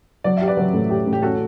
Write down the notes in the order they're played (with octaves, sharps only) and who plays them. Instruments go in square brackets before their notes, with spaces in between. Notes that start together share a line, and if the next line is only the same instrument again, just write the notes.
[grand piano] F#3 [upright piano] D5
[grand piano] G4 [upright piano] E5
[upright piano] B4 D5
[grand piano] F#3
A2
G4
A2
[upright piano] G4
[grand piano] C#4 [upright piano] F#4 A4